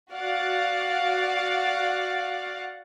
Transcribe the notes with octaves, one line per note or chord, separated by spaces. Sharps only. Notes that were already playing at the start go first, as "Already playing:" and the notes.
F#4 D5 F5 F#5